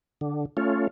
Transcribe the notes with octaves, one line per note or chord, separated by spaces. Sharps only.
D3
A3 C#4 F4